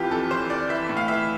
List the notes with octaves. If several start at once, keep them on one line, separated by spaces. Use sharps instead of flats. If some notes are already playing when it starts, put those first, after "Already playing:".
Already playing: F2 E3 F4 G4
F2 A4
E3 C5
F2 D5
E3 E5
A2
F5
E3 E5